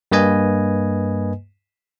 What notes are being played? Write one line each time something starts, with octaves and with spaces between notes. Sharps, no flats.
G2 A#3 B4 D#5 G#5